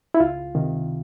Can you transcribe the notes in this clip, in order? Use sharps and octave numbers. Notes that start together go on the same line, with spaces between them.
E4
C#2 F4
C3 D#3